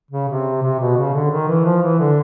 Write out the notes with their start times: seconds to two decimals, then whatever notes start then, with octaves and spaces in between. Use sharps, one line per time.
0.11 C#3
0.29 C3
0.63 C3
0.79 B2
0.97 C#3
1.14 D3
1.31 D#3
1.48 E3
1.65 F3
1.82 E3
2.00 D3